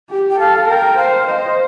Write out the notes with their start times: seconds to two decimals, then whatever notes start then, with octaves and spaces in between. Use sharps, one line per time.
0.10 G4
0.30 G5
0.39 A4 F5
0.68 A#4 G5
0.97 C5 F5
1.27 C5 D#5